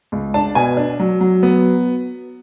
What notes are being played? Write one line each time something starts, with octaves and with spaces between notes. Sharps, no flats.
C#2
D4 A5
B2 G#5
D4
F#3
F#3
B3